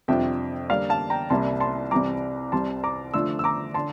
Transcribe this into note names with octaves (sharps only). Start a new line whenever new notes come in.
F2 C3 G3 D4 F4 E5 G5
D3 G3 A#3 D5 F5
F5 A5
G5 A#5
C2 C3 G3 A#3 E4 A5 C6
A5 C6
C2 C3 E3 G3 A#5 D6
C2 C3 G3 A5 C6
A#5 D6
D3 F3 A3 D4 F4 C6 E6
E6
A#5 D6
D3 A5 C6